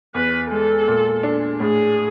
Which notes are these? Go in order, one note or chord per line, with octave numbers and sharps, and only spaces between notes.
E2 B4
G#3 A4
A#2
D4
A2 G#4